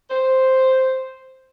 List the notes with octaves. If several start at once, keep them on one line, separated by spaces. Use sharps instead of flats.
C5